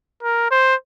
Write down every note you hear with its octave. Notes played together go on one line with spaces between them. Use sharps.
A#4
C5